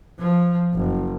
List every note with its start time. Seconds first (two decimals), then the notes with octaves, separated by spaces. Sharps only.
0.19 F3
0.74 F#1